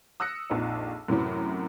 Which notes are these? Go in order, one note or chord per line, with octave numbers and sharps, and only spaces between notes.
D#6 E6 F#6 A#6 C#7
A#1 F2 D#4
F#2 A2 C3 E3 F#3